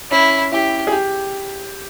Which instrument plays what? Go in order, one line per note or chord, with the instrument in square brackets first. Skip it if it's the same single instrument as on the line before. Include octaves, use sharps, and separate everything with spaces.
[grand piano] C#4 [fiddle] E4
[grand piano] E4 [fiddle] G4
[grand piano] G#4
G4